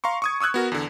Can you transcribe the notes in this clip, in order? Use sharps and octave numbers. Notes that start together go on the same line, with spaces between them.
F5 A#5 C6 C#6
C#6 D#6 G#6
C#6 D#6 E6 F#6 G#6
B3 F#4 A#4
E2 D3